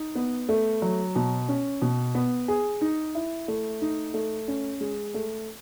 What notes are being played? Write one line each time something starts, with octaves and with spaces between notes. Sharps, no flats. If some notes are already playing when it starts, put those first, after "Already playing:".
Already playing: D#4
B3
A3
F#3
B2
C#4
B2
B3
G#4
D#4
E4
A3
D#4
A3
C#4
G#3
A3